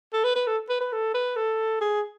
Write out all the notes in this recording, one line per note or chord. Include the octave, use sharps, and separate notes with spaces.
A4
B4
B4
A4
B4
B4
A4
B4
A4
G#4